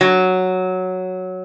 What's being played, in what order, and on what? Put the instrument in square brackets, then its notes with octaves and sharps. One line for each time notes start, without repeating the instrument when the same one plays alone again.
[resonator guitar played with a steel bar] F#3